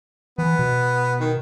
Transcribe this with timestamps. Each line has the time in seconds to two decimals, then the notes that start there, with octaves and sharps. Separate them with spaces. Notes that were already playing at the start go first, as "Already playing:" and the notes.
0.38 E3 B3
0.59 B2
1.20 D#3